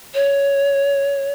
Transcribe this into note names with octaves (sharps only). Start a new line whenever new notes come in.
C#5